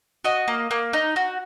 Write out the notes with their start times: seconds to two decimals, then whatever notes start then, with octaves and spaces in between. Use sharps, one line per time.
0.24 F#4 D#5
0.48 A#3
0.71 A#3
0.93 D#4
1.16 F#4